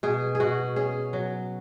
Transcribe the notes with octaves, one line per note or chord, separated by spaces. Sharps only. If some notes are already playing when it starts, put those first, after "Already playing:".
B2 G#4
G#4
B2 F#4
C#4 G#4
F#3